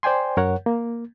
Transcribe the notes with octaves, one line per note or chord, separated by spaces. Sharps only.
C5 D5 G5 G#5 C6
F#2 A#4 C#5 F#5
A#3